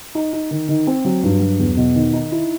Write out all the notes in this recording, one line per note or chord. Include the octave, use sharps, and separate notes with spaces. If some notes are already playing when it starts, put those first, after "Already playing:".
D#4
D#4
D#3
D#3
C4
F#3
G2
F#3
E2
B2
D#3
D#4
E4